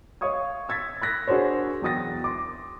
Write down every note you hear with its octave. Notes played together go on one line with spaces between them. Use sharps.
C#5 D#5 F5 C#6 D#6 G#6
E6 G#6 A6 B6
B5 F#6 A#6 B6
D4 F#4 G#4 A#4 C5 C#5
E2 F#3 G5 D#6 A6 A#6
C6 D6